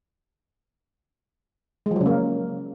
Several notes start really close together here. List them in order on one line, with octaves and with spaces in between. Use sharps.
G#3 F3 F#3 C#3 A#3